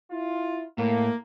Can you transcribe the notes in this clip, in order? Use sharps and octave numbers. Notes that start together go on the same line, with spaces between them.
E4 F4
A2 A#3